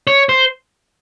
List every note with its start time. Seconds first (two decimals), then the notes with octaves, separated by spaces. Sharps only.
0.07 C#5
0.29 C5